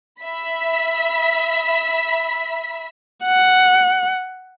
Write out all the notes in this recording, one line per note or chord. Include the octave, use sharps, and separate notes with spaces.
E5 B5 B6
F#5